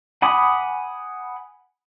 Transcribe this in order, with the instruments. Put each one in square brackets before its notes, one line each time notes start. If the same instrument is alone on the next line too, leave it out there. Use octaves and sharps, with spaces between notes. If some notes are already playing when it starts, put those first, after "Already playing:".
[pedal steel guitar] F#5 G#5 B5 D6 D#6